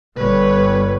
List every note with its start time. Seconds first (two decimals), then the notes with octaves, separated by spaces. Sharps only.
0.16 G1 B4 C#5